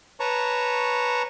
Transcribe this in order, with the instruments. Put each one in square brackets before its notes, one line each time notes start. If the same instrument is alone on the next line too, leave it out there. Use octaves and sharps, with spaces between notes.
[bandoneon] B4 C#5 A5 A#5 C#6